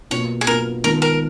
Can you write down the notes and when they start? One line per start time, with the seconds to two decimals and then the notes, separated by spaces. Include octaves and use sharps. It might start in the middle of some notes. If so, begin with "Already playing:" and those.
0.10 B2 A#3 F4 C#5
0.41 G#4
0.47 B2 A#3 F4 A#4
0.84 D#3 G#3 B3 F4 A#4
1.02 A#4